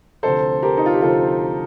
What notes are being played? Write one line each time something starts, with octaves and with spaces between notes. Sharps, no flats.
D2 C3 F3 A4 C5
G4 A#4
D#4
F4
G4
D2 C3 F3 F4 A4